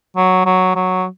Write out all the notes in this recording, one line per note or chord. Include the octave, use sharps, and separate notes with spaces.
F#3
F#3
F#3